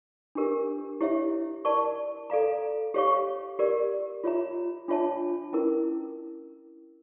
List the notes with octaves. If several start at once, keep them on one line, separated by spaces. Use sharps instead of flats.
D4 G4 A#4
E4 G4 C#5 E5
A#4 D5 A5 C#6
A4 D5 F5 A#5
G4 C#5 F5 C#6
G4 A#4 D5
F4 C#5 E5 A#5
D4 F4 C#5 E5 A5
C#4 E4 A#4